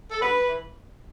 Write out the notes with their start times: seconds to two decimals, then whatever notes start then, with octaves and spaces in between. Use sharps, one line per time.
0.12 A4
0.21 G2 B4
0.46 E3